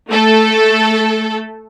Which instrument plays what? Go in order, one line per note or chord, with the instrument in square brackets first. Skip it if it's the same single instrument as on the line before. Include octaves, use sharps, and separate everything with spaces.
[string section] A3 A4